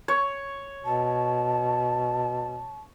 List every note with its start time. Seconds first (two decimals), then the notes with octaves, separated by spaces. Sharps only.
0.08 C#5
0.85 B2 A5